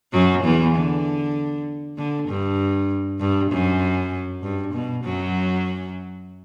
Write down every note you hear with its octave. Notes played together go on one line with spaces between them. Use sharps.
F#2 F#3
E2 E3
D3
D3
G2
G2
F#2
G2
B2
F#2 F#3